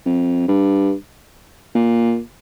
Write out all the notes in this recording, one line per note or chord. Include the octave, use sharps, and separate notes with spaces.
F2
G2
A#2